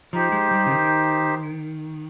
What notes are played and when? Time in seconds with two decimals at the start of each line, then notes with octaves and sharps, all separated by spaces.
0.13 F3 D#4 G4 C5
0.32 G#3
0.51 G3
0.66 C#3
0.70 D#3